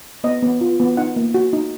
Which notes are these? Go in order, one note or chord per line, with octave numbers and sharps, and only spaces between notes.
B3 D#5
B3
F4
B3
D#4 F#5
A#3
F#4
D#4